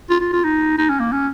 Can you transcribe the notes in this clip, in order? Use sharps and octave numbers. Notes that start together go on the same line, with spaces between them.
F4
F4
F4
D#4
D#4
C#4
A#3
C#4